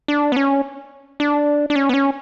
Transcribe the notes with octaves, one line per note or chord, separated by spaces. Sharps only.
D4
B3
C#4
D4
D4
C#4
B3
C#4